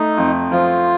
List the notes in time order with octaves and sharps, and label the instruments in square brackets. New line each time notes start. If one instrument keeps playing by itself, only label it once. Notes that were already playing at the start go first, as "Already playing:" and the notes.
Already playing: [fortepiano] A3 [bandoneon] D#4
[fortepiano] F2
[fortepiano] F3 [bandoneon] F4